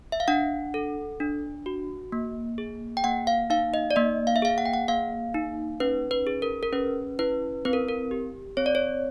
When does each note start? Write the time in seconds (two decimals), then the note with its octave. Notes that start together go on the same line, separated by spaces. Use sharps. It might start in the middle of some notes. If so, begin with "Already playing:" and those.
0.12 E5
0.20 F5
0.28 D4 F#5
0.74 A4
1.20 D4
1.66 F#4
2.12 A#3
2.58 G#4
2.97 G5
3.04 A#3 F#5
3.27 F5
3.50 D#4 F5
3.74 D#5
3.91 D5
3.96 A#3 D#5
4.27 F5
4.36 E5
4.42 G#4 F5
4.58 F#5
4.66 G5
4.73 F#5
4.88 A#3 F5
5.34 D#4
5.80 C#4 B4
6.11 B4
6.27 G#4
6.42 A#4
6.63 A#4
6.73 C#4 B4
7.19 E4 B4
7.65 C4 B4
7.73 A#4
7.88 A#4
8.11 G4
8.57 C4 C#5
8.66 D5
8.75 C#5